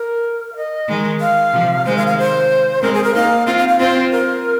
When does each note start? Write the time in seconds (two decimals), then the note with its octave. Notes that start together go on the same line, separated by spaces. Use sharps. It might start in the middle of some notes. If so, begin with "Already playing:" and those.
Already playing: A#4
0.52 F5
0.56 D#5
0.89 D#3 G#3
1.21 F5
1.53 C3 F3
1.85 D#3 G#3 C5
1.97 F5
2.07 F5
2.18 C5
2.82 G#3 C4 A#4
2.93 G#4
3.04 A#4
3.15 A#3 D#4 F5
3.46 C4 F4 F5
3.58 F5
3.68 F5
3.79 C4 F4 C5
4.12 A#4